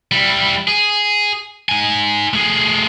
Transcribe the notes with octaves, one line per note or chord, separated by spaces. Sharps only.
G3 E4
G#4
D#4 G#5
A3 G#4